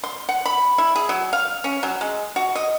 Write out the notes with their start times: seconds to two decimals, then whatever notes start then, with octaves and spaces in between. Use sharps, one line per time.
0.04 C6
0.29 F#5
0.46 B5
0.78 E4
0.96 G#4
1.09 F#3
1.33 F5
1.64 C#4
1.83 F#3
2.01 G#3
2.36 F#4
2.55 D#5